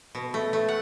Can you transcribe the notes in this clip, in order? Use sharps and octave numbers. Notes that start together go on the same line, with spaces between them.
B2
A3
A3
F#5